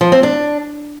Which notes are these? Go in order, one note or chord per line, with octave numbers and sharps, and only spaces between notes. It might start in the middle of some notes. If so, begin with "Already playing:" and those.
F3
C4
D4